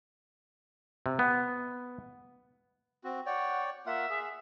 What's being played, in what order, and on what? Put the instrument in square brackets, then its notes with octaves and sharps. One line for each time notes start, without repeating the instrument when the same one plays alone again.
[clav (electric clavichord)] C3
B3
[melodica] C4 F#4
[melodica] C#5 D5 G5 [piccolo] F#5
[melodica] A#3 F4 F#5 [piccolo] E5
[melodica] G#4